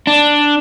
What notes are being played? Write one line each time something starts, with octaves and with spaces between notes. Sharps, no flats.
D4